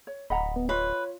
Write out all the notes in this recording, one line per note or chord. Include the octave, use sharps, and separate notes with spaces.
C#5
D1 D#5 F#5 A#5 B5
B3
F4 B4 C#5 D#5